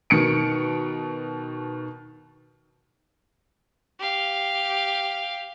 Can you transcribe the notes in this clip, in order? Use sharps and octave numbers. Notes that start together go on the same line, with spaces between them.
B2 D#3 C#7 D7
G4 F5